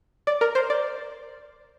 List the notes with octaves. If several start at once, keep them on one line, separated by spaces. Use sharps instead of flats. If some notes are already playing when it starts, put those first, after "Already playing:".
D5
A#4
C5
D5